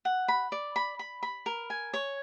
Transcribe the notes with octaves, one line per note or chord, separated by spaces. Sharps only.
F#5
B5
D5
B5
B5
B5
A#4
G#5
C#5